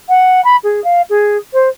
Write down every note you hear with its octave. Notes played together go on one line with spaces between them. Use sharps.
F#5
B5
G#4
F5
G#4
C5